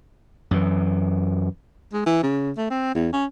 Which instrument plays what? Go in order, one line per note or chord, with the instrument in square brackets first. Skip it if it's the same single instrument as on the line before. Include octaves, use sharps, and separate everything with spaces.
[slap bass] F#2 E3
[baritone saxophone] G#3
E3
C#3
A3
C4
E2
C#4